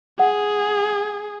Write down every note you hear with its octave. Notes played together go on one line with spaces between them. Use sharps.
G#4 F#5